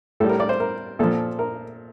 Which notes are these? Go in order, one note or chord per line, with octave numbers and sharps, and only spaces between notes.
A2 G3 A4
A#4
D5
C5
A#4
A#2 F3 A4
A#4